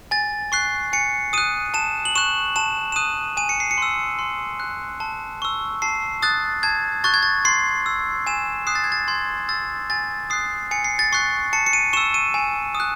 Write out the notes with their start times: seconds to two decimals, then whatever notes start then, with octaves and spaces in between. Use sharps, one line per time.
0.11 G#5 A6
0.52 C#6 F#6 C7
0.93 G#5 C#7
1.33 D#6 F#6 D#7
1.74 A5 E7
2.05 F#7
2.15 C#6 F#6 E7
2.56 A5 E7
2.92 E7
2.96 D#6 F#6 D#7
3.37 G#5 D#7
3.49 C#7
3.60 C7
3.71 C#7
3.78 C6 E6
4.19 C6
4.60 F#6
5.00 A5
5.42 C#6 E6
5.82 A5 C7
6.22 D#6 F#6 A6
6.63 A5 G#6
7.04 C#6 F#6 A6
7.14 G#6
7.23 A6
7.45 C6 C7
7.86 E6
8.27 G#5 E7
8.67 D#6 F#6 C7
8.75 A6
8.84 G#6
8.92 A6
9.08 C6 G#6
9.49 E6 A6
9.90 G#5 A6
10.30 D#6 F#6 C7
10.71 G#5 C#7
10.85 C7
10.99 A6
11.13 C#6 F#6 C7
11.53 A5 C#7
11.66 C#7
11.73 D#7
11.93 C#6 E6 E7
12.14 D#7
12.34 G#5
12.75 D#6
12.80 F#6